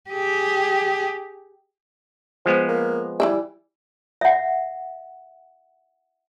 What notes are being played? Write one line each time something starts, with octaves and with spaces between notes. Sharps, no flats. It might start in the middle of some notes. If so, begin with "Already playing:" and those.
G4 G#4
F3 G#3 B3 C5
A#3
E3 G3 D4 E5
E5 F#5